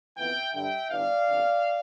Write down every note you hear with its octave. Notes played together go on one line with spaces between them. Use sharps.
F2 E3 B3 E5 G5
G2 D3 G3 E5 G5
G1 G2 E3 D5 F5
G1 F2 D3